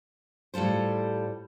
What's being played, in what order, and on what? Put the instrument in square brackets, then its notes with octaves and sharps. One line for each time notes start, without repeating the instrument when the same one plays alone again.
[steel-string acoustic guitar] A2 G3 F4 A4 C5